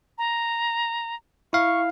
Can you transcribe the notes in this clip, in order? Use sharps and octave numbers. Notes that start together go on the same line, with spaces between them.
A#5
E4 F5 C#6